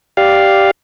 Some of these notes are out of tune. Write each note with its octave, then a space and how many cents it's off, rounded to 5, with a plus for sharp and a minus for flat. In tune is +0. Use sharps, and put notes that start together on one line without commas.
G4 -5 D5 +0 F5 +0